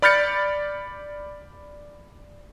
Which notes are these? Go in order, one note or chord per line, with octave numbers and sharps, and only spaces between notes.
D5 B5 F6 G6 A6 C#7